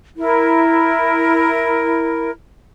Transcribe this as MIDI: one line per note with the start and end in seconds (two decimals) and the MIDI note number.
0.17 2.31 64
0.17 2.31 70